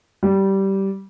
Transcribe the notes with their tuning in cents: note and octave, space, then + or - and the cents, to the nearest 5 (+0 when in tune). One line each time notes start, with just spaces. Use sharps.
G3 -15